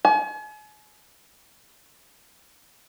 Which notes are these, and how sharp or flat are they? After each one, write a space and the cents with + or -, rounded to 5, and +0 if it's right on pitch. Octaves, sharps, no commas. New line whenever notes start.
G#5 +40